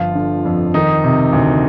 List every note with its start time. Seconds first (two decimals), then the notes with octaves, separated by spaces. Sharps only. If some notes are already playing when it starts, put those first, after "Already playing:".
Already playing: G1 F3 F4
0.15 D3
0.45 F2
0.74 D#3 D#4
1.04 C3
1.33 D2